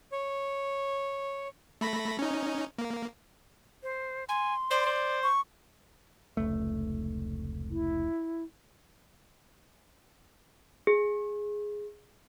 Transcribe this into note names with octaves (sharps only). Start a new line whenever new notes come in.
C#5
A3 B5 A#6
C#4 D#4
A#3
C5
G#5 C6
C5 D5
C5
C#6
F1 C#2 A3
E4
G#4